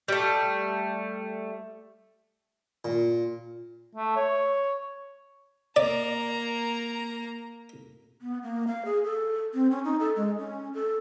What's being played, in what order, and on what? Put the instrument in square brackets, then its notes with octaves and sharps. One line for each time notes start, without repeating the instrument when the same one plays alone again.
[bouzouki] G3 A3
[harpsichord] A#2
[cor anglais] A3
C#5
[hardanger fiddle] A#3 A#5 [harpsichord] D5
[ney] B3
A#3
F5
G#4
A4
C4
C#4
D#4
A4
G#3
C#4
A4